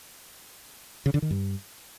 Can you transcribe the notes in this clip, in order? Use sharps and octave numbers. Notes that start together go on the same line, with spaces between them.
C#3
D3
D#3
G2